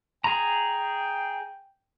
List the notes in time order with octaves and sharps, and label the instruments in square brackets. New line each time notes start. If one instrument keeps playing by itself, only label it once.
[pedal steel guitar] G#4 A#5 [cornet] G5